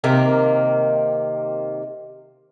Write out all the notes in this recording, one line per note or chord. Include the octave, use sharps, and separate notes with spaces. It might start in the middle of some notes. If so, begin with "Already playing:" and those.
C3 D#3 A#3